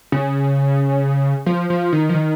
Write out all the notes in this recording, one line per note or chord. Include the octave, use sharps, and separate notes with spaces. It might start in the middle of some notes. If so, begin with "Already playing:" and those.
C#3
F3
F3
D#3
F3
D#3